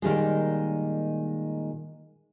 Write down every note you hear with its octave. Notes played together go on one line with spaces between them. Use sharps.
A#2 D#3 G3 G#3